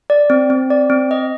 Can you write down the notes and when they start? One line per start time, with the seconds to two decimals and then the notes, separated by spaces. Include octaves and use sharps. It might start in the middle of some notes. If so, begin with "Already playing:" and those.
0.10 D5
0.30 C4
0.50 C4
0.70 D5
0.90 C4
1.11 D#5